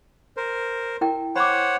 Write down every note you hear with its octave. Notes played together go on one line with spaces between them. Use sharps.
A#4 C5
E4 A#4 G5
C5 C#5 F#5 B5 D6